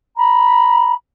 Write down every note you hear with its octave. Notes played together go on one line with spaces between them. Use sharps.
A#5 B5